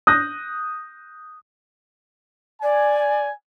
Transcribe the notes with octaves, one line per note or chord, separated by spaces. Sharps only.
D#6 F#6 G6 A#6
D5 G#5